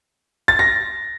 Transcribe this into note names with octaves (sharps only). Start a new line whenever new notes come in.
A6
A#6